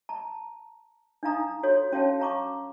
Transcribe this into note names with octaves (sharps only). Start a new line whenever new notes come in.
A5 A#5
D4 D#4 F5 A#5 D#6
F4 F#4 A4 C#5
C#4 F#4 C#5 F5 G5 A5
F5 A#5 C#6 D6